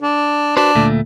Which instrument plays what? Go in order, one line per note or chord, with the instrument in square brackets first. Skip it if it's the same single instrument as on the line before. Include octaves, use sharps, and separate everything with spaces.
[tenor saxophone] D4
[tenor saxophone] D4 [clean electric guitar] F#4 B4 C5
[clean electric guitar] D2 A#2 A3